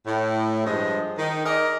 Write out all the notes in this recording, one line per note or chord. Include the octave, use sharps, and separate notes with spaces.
A2
G2 F3 G#3 D#5
D#3 D#4
G#4 A#4 D5 D#5